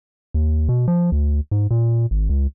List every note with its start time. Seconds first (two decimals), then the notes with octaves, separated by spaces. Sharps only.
0.34 D#2
0.69 B2
0.88 F3
1.12 D2
1.51 G#2
1.71 A#2
2.11 G#1
2.29 C#2